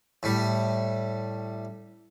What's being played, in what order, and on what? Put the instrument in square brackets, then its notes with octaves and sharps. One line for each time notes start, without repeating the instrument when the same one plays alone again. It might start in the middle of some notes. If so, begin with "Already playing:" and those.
[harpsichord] A2 G3